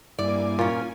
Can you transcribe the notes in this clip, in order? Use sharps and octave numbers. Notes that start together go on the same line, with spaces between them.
G2 A#3 E4 D5 G#5 D6
A#2 C#4 F4